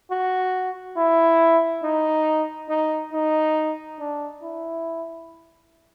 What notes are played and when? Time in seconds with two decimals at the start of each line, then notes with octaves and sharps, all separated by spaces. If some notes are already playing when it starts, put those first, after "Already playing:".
0.11 F#4
0.97 E4
1.83 D#4
2.69 D#4
3.13 D#4
3.99 D4
4.43 E4